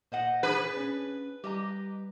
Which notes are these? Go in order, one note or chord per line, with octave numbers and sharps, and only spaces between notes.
A#2 C5 D#5 F#5
D4 G#4 B4
C#4
G3 G4 D#5 A#5